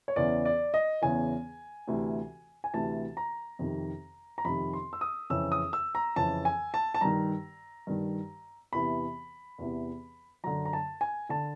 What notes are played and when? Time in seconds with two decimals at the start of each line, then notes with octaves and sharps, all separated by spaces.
0.08 C#5
0.16 E2 C#3 E3 D5
0.45 D5
0.74 D#5
1.02 E2 C#3 E3 G#5
1.88 D2 C3 E3
2.64 G#5
2.74 D2 C3 E3 A5
3.17 A#5
3.59 F2 C3 D#3
4.38 A#5
4.44 F2 C3 D#3 B5
4.73 C6
4.93 E6
5.01 D#6
5.30 F2 C#3 E3 E6
5.52 D#6
5.73 E6
5.95 A#5
6.16 F2 C#3 E3 A5
6.45 G#5
6.74 A5
6.94 A5
7.01 G2 D#3 A#5
7.87 G2 D#3
8.72 E2 C3 E3 B5
9.59 E2 C3 E3
10.44 F#2 D3 A#5
10.65 A#5
10.73 A5
11.01 G#5
11.29 D3 A5